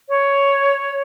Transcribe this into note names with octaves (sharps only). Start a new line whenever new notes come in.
C#5